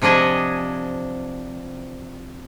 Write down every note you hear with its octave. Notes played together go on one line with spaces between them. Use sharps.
C3 F3 D4 D#5 G#5